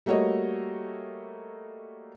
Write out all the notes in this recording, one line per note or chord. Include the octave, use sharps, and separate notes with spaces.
G3 A3 A#3 F#4 C#5 D#5